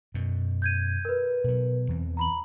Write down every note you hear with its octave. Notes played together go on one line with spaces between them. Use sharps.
F#2 B2
G6 G#6 D#7
A#4 B4
B2 F#3
E2 E3 C4
A#5 B5 F#7